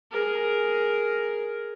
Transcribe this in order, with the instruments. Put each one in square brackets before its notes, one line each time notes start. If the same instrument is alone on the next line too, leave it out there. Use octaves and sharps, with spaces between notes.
[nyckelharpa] G#4 A#4